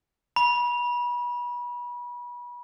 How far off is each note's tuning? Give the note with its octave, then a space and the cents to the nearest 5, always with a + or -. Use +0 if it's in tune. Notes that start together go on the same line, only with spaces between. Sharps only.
B5 -30